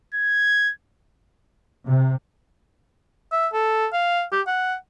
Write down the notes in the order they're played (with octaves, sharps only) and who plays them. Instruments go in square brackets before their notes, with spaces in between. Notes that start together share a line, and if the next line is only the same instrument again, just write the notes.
[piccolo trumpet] G#6
[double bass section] C3
[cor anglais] E5
A4
F5
G4
F#5